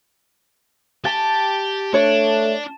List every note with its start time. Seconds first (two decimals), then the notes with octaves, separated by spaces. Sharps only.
1.05 G4 A5
1.94 A3 D4 C#5